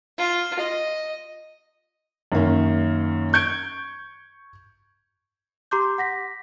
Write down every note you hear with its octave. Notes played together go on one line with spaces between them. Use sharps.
F4
D#5
F#2 D#3 A#3 C#4
C#6 G6 G#6 D7
G4 A#5 C6 D6 G6
F#5 A#6 B6